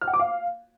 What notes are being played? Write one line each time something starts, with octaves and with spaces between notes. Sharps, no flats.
F6
F#5
D6
F5